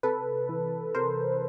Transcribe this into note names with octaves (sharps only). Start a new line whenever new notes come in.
C3 A4 B4
E3
C3 A#4 C5